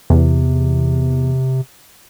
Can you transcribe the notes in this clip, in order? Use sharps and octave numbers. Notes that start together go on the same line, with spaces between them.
E2 C3